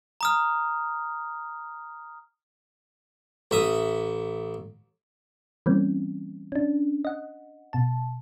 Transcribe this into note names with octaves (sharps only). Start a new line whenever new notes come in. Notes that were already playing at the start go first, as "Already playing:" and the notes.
A#5 D#6 F6
A1 E5 D#6
E3 G3 A#3 C4 C#4
C#4 D4
D#5 F#5
B2 A5